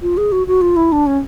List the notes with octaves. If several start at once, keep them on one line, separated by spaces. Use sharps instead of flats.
F4
G#4
F#4
F#4
F4
E4
D4
C#4